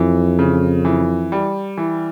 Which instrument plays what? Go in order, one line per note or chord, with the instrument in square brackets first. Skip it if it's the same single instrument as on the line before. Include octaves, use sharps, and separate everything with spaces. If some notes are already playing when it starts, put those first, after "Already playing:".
Already playing: [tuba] F2 [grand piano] E3
[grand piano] C#3
E3
G3
E3